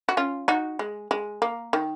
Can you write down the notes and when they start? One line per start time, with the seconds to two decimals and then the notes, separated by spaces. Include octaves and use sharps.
0.09 F#4
0.17 C#4 F4
0.48 D#4 F#4
0.79 G#3
1.11 G#3
1.42 A#3
1.73 D#3